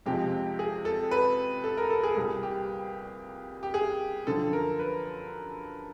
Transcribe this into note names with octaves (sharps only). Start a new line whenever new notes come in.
F2 C3 F3 G#3 G4
G#4
A4
B4
A4
A#4
A4
G#4
C2 A#2 G3 G#4
G4
G4
G#4
F#2 D3 F3 A4
A#4
B4